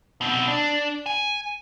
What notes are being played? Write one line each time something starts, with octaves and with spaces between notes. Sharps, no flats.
B2 C4
D4
G#5